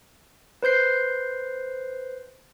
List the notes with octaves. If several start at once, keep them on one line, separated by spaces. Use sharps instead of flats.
B4 C5 G6 C7